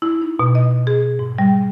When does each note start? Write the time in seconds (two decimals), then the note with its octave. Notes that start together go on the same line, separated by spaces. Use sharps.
0.02 E4
0.22 D#4
0.39 B2
0.55 D#5
0.87 G#4
1.19 G#2
1.38 G3